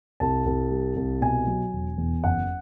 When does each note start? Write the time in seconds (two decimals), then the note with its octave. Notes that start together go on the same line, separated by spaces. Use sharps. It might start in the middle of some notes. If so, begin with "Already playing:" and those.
0.20 C2 A5
0.45 C2
0.71 G3
0.96 C2
1.21 B2 G#5
1.47 F#3
1.73 E1
1.98 E2
2.23 F#1 F#5